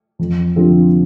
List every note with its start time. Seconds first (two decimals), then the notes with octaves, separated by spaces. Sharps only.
0.19 F2
0.56 D3 F3 C4 G4